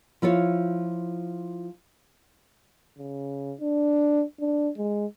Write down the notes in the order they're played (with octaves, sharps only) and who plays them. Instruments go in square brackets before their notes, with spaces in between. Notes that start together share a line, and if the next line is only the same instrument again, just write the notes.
[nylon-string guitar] F3 E4 F4 C#5
[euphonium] C#3
D4
D4
G#3